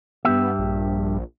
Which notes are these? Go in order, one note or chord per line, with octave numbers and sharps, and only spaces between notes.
G2 B3 G4 E5
A#1